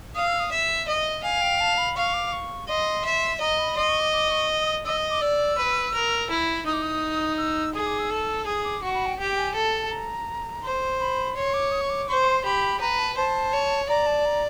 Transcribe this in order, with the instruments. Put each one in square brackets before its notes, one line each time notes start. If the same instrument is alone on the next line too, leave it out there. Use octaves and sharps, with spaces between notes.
[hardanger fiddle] F5 [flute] D#6
[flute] E6
D#6
[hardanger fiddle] E5
D#5
[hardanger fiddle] F5 [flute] G#5
[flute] G5
A5
B5
[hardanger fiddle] F5 [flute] C#6
[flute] D6
C#6
[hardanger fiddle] D#5 [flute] C6
[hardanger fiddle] E5
[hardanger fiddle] D#5 [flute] A#5
[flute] B5
[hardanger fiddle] D#5 [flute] C6
[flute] C#6
D6
D6
C#6
D#6
[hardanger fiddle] D#5 [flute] E6
[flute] D#6
D6
[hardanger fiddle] D5 [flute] E6
[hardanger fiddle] B4
A#4
E4
[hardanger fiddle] D#4 [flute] D#6
[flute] D6
D#6
E6
[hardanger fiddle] G#4 [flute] D#6
[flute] D6
E6
[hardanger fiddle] A4
[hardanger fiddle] G#4 [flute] D#6
[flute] D6
[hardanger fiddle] F#4 [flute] C#6
[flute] B5
G5
[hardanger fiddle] G4 [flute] G5
[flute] G#5
[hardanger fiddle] A4 [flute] A5
[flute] A5
A#5
[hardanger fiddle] C5
[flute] B5
[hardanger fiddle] C#5 [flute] C6
[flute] D6
D#6
C#6
D6
[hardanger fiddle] C5 [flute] C#6
[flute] C#6
C6
[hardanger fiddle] G4 [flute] B5
[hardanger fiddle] B4 [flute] A#5
[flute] A5
[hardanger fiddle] C5 [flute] A5
[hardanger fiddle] C#5
[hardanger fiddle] D5 [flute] A#5
[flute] A5
A#5